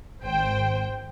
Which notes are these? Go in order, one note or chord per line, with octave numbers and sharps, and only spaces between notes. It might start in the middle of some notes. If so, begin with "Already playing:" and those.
G#1 C5 G5